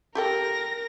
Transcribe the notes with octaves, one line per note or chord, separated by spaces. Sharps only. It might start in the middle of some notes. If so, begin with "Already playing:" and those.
G4 A4 A#4 G5 A#6